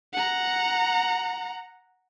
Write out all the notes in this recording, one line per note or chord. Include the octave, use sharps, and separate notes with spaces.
F#5 A#5